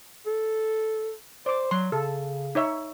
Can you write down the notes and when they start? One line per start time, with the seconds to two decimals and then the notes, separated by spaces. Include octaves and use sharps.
0.26 A4
1.46 C5 D5 D6
1.71 F#3 C6
1.92 C#3 A4
2.55 D#4 C#5 E5